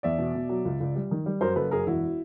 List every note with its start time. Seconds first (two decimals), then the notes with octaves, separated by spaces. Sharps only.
0.03 E2 D5 E5
0.18 B2
0.35 B2
0.49 F#3
0.65 C#2
0.80 C#2
0.96 G3
1.11 D#3
1.26 G3
1.41 F#2 A#4 C5
1.56 F#1 A4 B4
1.71 F#2 G#4 A#4
1.87 E1 E4 F#4